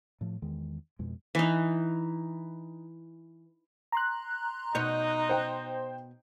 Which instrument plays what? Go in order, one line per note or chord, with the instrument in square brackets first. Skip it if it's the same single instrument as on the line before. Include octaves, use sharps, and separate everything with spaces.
[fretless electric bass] A2 F3
E2 D#3 G#3
F2 B2 G#3
[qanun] E3 D#4
[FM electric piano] A#5 C6 F#6
[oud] B2 C#5 D#5 [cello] D#4 [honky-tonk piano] G6
[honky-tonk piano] C5 G5